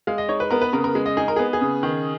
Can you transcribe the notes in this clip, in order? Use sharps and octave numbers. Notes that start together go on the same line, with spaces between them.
G#3 F5
D#5
D#4 C#5
B4
B3 A#4
B4
C#3 A#4
A#4
G#3
D#5
D#4 G#4
A#4
B3 G#4
G#4
C#3
D#3